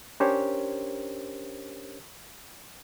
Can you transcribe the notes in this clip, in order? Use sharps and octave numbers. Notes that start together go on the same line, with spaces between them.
C#4 D4 G4 A#4 C5 C#5